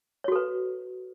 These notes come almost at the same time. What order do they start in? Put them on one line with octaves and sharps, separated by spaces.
C#5 F#4 A4 B4